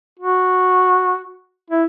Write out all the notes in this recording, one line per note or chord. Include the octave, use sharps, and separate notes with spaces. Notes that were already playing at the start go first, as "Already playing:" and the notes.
F#4
E4